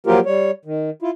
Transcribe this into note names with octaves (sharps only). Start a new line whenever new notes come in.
F3 F#3 A#3 F4 G4 A#4
G3 C#5
D#3
E4 F4